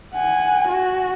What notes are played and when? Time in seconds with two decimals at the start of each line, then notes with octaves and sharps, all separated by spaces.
0.14 F#5 G#5
0.68 F#4